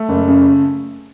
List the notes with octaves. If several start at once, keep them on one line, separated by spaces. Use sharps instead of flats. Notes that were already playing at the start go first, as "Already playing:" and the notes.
Already playing: A3
F#1
C#3